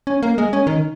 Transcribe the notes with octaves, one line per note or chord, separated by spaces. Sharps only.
C#4
A#3
G#3
C#4
D#3